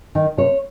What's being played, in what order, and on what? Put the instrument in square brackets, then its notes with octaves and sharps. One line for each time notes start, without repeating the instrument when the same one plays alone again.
[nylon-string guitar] D#3
C3 C#5